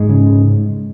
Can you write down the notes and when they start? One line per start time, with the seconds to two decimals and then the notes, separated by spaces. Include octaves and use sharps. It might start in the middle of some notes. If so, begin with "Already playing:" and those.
Already playing: G#2 G#3
0.09 C#3